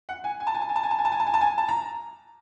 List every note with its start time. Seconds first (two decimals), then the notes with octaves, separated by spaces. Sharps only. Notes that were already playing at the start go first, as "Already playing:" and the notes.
0.09 F#5
0.24 G#5
0.40 G#5
0.47 A5
0.54 G#5
0.62 A5
0.69 G#5
0.76 A5
0.83 G#5
0.91 A5
0.99 G#5
1.05 A5
1.12 G#5
1.20 A5
1.27 G#5
1.34 A5
1.41 G#5
1.58 A5
1.69 A#5